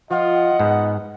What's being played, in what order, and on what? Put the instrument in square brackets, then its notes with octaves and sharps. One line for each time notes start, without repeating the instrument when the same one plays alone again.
[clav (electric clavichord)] F3 [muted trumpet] F4 [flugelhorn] D#5 [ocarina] F#5
[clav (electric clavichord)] G#2 [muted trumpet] B3